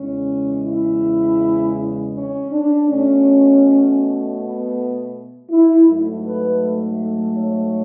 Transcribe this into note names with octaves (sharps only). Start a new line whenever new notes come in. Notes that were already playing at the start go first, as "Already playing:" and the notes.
Already playing: E2 C#3 E3 G#3 C#4
E4
C#4
D4
B2 A3 C#4
B3
E4
G#2 F#3 A3
B4
C#5